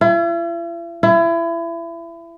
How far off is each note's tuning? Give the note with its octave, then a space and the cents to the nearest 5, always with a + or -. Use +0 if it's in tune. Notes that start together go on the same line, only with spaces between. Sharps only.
E4 +45
E4 +30